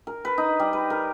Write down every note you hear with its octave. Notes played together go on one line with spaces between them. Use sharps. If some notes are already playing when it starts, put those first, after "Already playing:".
A#4
B4
D#4
G3
B4
A#4